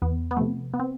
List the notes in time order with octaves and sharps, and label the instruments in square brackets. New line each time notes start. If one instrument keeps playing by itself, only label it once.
[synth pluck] E2 B3
B3
C3 F3 A3
B3
C4